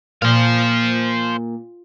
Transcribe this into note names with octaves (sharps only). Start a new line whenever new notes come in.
A#2 C5 F5